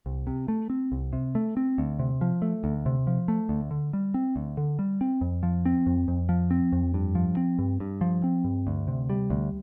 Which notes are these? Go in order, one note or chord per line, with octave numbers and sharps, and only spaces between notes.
C2
C3
A3
C4
C2
C3
A3
C4
D2
C3
F3
A3
D2
C3
F3
A3
D2
D3
G3
C4
D2
D3
G3
C4
F2
F3
C4
F2
F2
F3
C4
F2
G2
F3
C4
G2
G2
F3
C4
G2
D2
C3
G3
D2